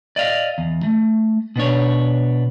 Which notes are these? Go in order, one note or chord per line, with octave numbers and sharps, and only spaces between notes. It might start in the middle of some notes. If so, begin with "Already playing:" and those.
D5 D#5 F5
E2
A3
B2 B3 D4 C#5